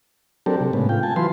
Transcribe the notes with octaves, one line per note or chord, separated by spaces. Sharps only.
F#3 C4 D4 G4 A4 A#4
C3
A2 C#3 G#3 B3
F4 G5
G#5 A5
E3 F#3 F4 B4 C6